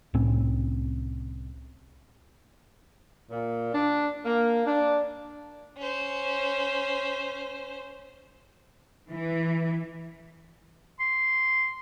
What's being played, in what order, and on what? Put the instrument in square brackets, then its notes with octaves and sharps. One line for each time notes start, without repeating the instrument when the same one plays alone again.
[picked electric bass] C2 A2 C4 C#4
[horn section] A#2
D4
A#3
D4
[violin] C#4 C5
[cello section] E3
[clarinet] C6